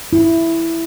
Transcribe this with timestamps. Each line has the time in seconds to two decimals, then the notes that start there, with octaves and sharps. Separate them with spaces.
0.13 E4